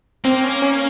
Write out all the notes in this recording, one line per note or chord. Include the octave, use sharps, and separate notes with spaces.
A#3 C4
C#4
C#4